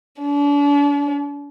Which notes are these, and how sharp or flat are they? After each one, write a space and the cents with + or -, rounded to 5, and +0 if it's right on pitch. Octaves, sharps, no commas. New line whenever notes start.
D4 -40